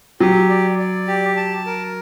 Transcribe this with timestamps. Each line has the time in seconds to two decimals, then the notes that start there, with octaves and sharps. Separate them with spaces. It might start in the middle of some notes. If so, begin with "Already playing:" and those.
0.20 F#3 G4
0.49 D5
0.79 D5
1.08 G4
1.37 A5
1.66 A#4